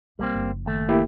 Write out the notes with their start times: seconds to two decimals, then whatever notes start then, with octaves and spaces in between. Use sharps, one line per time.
0.19 B1 G3 A#3 C4
0.35 F#1 F3
0.66 D#2 A3
0.89 A#3 E4 G4